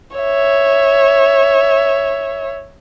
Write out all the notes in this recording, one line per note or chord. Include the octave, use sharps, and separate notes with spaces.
C#5 E5